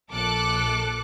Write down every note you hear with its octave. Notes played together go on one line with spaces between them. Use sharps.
A#1 A4 D6 F#6